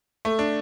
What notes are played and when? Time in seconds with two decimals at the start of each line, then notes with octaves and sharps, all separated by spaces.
0.25 A3
0.39 D4